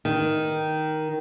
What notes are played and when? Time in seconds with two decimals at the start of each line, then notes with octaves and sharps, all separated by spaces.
0.05 D#3